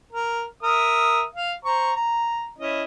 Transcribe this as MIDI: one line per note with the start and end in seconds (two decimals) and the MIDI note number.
0.12 0.44 70
0.63 1.22 70
0.63 1.22 76
0.63 1.22 87
1.34 1.53 77
1.65 1.92 72
1.65 1.92 82
1.65 1.92 85
1.95 2.49 82
2.58 2.84 61
2.58 2.84 64
2.58 2.84 75